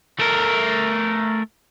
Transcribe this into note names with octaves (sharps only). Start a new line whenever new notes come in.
A3 A#4